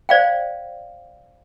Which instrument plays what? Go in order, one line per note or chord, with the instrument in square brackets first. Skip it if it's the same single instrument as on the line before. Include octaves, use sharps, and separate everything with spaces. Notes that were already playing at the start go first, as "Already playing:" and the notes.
[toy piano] C5 D5 F5 G5